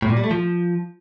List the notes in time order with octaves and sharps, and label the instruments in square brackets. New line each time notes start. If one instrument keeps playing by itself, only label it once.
[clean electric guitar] A2
A#2
G3
A3
F3